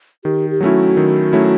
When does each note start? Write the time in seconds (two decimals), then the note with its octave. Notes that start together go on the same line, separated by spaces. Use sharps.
0.24 D#3 G4
0.50 G4
0.61 F#3 A3 C#4 E4 F#4 G4
0.97 D#3
1.33 F#3 A3 C#4 E4